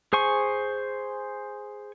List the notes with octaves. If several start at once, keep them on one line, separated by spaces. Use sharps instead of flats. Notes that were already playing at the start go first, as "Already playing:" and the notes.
G#4 C5 G#5 C#6